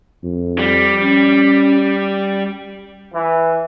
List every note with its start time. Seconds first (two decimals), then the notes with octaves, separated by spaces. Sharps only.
0.24 F2
0.59 G3
1.03 C#4
3.13 E3